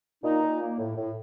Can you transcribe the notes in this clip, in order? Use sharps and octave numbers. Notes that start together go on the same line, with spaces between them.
A#2 D#4
A#2
A#3
A2
A2